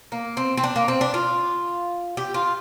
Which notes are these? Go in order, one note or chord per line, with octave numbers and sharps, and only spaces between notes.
A#3
C4
C4
D4
A#3
C4
D4
F4
G4
F4